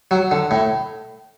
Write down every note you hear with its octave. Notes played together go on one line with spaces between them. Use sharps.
F#3
D3
A2